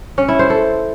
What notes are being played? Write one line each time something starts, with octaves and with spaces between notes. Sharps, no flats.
C#4
E4
C5
A4